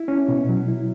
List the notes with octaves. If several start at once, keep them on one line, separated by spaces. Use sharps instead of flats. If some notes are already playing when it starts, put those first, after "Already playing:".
Already playing: E4
C#4
B2
F#3
E4